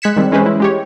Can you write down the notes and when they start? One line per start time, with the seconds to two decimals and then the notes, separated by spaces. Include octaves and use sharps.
0.02 G#3 F#6 G#6 B6 C#7 E7
0.17 D#3 G3 G#3 C4
0.31 E3 G#3 C#4 G#4 B4 C5
0.46 E4
0.60 G#3 G4 C#5